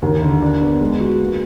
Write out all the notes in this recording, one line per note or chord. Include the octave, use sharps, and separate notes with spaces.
D#2
D3
D4
B3
G#3
F#4
A#3